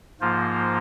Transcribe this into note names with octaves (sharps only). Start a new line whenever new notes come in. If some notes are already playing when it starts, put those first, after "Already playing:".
G#2 F3 A#3 F4 C5